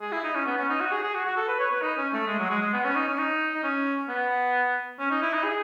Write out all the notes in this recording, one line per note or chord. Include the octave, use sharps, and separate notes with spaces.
G#4
E4
D#4
C#4
B3
C#4
D#4
F#4
G#4
G#4
F#4
F#4
A4
B4
C#5
B4
D#4
C#4
A3
G#3
F#3
G#3
G#3
B3
C#4
D#4
C#4
D#4
D#4
C#4
B3
C#4
D#4
E4
D#4
G#4